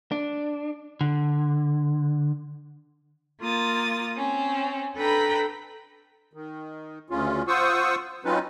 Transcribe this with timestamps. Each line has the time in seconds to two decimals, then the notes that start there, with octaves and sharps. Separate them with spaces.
0.12 D4
1.01 D3
3.41 A#3 F4 D#6 A6
4.17 C4 C#4
4.96 D4 A4 B4 G5 A#5 B5
6.33 D#3
7.10 D2 C#3 C#4 F4
7.48 F4 C5 F#5 C#6 D#6 E6
8.25 F#3 C4 C#4 D#4 F4 B4